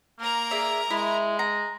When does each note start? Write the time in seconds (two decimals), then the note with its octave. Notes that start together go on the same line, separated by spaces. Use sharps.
0.20 A#3 A#4 A#5
0.51 G#4 D5 E5
0.90 G#3 E4
1.39 A#5